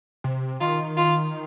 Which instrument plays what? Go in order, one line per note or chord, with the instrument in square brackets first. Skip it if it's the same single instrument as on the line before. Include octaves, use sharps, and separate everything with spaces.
[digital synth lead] C3
[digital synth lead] D#3 [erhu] F4
[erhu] F4